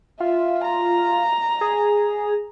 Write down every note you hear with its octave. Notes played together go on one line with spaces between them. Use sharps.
F4 E5
A#5
G#4